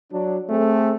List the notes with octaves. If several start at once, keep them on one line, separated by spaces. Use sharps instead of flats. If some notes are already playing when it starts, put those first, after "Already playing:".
F#3 D4
A3 C4 G#4 A4